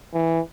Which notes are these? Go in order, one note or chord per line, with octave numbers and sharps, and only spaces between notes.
E3